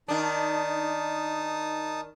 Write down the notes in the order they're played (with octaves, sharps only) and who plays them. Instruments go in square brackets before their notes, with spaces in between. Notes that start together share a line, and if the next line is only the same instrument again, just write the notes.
[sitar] D#3 D4 [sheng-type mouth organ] D#4 A5 D#6